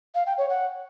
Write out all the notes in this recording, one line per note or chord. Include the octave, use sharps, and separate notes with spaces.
F5
G5
C#5
F#5